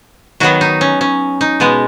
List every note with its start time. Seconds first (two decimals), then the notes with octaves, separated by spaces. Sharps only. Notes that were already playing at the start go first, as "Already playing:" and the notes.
0.40 D#3 F#3 B3 F#4
0.61 D#4
0.81 C#4
1.01 C#4
1.41 D#4
1.60 B2 G#3 B3